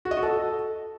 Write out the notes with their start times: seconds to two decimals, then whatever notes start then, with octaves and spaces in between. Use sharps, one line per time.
0.05 F#4
0.11 D#5
0.17 F#4
0.23 A4